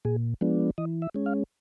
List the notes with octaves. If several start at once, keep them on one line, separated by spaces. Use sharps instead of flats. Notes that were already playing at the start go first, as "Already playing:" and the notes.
A#2 G#4
F3 G#3 B3 D4
E3 D#5
E5
G#3 C#4
F5